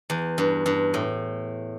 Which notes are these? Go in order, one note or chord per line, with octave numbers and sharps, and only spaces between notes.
E2
G2
G2
A2